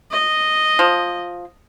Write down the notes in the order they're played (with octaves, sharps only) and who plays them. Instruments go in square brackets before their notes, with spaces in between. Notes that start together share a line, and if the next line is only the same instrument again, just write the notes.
[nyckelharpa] D#5
[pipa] F3